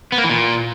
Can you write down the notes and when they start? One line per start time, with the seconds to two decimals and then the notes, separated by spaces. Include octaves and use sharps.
0.12 B3
0.18 A#3
0.24 E3
0.30 A#2